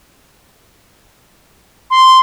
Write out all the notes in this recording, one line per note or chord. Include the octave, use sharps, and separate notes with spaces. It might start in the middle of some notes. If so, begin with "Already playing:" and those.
C6